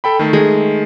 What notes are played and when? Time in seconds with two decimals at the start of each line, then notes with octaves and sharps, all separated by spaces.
0.04 A4 G5 B5
0.19 D#3 A3
0.33 G#3